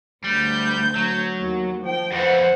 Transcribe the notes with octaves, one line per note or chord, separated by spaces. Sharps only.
D2 G3 G6
F#3
D#2 F#4
F3 G5
F2 E3 C5 F#5